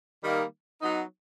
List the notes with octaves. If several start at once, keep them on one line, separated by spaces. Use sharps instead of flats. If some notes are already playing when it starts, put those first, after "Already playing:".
D#3 G3 A#3 D#4
F#3 B3 D#4